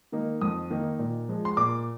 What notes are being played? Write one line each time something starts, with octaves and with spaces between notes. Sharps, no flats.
D#3 A#3 D#4
F2 D#6
D#3 A#3 D#4
A#2
F3 G#3
C6
A#2 D6